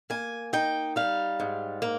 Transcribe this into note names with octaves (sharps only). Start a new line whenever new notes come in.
A#3 G#5
D#4 G5
G3 F5
G#2
A#3